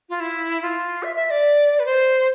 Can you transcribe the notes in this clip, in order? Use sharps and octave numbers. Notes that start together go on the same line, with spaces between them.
F4
E4
F4
E5
E5
D5
B4
C5